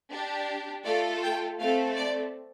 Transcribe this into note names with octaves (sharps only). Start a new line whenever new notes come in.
D4 G4
A3 F4 A4 D5
G5
A3 C4 A4 F5
D5